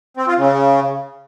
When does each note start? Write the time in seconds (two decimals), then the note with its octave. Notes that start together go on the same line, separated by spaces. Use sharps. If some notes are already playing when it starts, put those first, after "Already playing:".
0.17 C4
0.27 F4
0.38 C#3